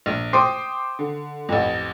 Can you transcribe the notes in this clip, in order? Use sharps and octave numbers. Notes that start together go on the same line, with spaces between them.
A#1
C5 G5 C6 D6 D#6 C7
D3
A1 F2